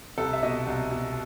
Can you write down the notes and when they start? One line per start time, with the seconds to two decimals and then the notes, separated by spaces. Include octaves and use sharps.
0.18 C2 A4
0.33 E5
0.43 B2 D#5
0.67 C2
0.91 B2